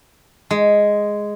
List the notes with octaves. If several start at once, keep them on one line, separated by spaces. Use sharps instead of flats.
G#3